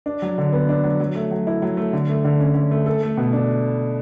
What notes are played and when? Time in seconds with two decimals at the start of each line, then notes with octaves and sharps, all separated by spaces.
0.06 D4
0.22 F#3
0.38 D3
0.52 B3
0.69 D4
0.84 F#3
1.00 F#3
1.15 A3
1.31 F#3
1.47 E4
1.62 F#3
1.77 A3
1.93 D3
2.09 A3
2.25 D3
2.40 C#4
2.55 D3
2.71 A3
2.86 A4
3.02 A3
3.17 B2
3.33 D4